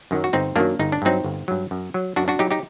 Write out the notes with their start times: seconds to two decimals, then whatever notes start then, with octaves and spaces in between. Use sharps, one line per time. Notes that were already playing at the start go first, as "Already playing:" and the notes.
0.11 F#2 D#3 F#3
0.24 F#4
0.33 G1 C4 D#4
0.56 F#2 D#3 F#3 A#3 D4
0.79 G1 D#4
0.92 D4
1.02 G2 F#3 C4 D#4
1.24 G1
1.48 G2 F#3
1.71 F#2
1.94 F#3
2.16 F#2 D4 F#4
2.28 D4 F#4
2.39 F#3 D#4 G4
2.51 D#4 G4